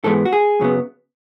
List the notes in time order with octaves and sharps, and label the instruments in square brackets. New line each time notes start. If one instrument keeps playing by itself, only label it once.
[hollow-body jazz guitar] G#2 E3 G#3 B3 A4
F#4
G#4
F#2 C#3 F#3 B3